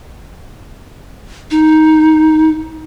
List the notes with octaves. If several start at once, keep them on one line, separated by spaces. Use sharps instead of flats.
D#4